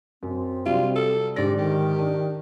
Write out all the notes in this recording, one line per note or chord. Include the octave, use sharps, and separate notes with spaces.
F#2 C4
C3 F#3 G3 F4
A4
G#2 D3 G4 D5 A#6
D#3 G4
D4